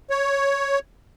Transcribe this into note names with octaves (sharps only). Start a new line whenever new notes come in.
C#5